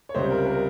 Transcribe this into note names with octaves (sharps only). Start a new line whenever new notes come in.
C#5
C#2 C3 G3 C5
A#4
A#4